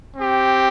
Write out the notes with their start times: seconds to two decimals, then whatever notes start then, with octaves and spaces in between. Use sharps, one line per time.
0.16 C4 G4